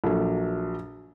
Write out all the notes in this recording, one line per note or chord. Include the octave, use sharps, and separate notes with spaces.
A#1 F#3 A4